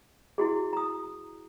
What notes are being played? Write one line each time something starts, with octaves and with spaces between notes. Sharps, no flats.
E4 F#4 G#4
A#5 D#6